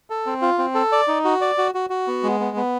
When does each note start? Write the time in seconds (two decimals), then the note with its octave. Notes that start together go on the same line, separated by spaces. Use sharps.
0.10 A4
0.26 C4
0.42 F4
0.58 C4
0.75 A4
0.92 D5
1.08 D#4
1.25 F#4
1.41 D5
1.58 F#4
1.75 F#4
1.90 F#4
2.07 B3
2.23 G#3
2.40 B3
2.57 B3